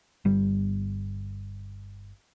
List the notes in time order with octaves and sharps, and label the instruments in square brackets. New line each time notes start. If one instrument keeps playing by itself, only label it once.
[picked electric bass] G1 G3